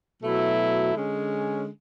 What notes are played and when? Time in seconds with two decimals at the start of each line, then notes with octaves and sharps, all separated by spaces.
0.23 B2 F#3 A3 E4
0.96 D3 G#3 C#4